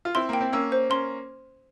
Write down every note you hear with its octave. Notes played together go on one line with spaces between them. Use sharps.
F4
C4 E4 C6
A#3 G5
C4
A#3 C#4 E6
C5
A#3 C#4 C6